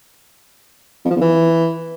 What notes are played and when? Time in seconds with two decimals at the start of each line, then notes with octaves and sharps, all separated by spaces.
1.05 F2
1.10 F3
1.16 E2
1.21 E3